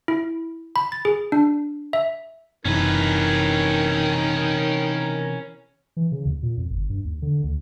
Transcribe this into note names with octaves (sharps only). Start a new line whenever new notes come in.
E4
B5
A6
G#4
D4
E5
F#1 C3 D#3 E3 C#4 A#4 B4
E3
C#3
D#2
A#2
F2
G1
G2
D#2
D3
D2